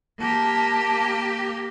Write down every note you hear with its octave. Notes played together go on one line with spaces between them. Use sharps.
A#3 G4 A5